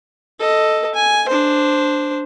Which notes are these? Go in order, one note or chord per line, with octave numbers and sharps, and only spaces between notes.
A4 D#5
G#5
D4 C5